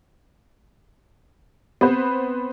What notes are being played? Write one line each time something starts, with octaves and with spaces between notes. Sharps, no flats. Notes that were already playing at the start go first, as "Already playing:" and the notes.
B3 C4 B4 C5